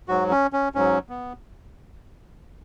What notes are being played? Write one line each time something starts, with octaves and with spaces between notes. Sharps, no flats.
G#2 F#3 F#4
C#4
C#4
G#2 F#3 C#4
B3